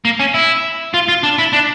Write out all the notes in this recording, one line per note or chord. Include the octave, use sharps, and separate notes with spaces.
A#3
C#4
E4
F4
F4
D4
E4
D4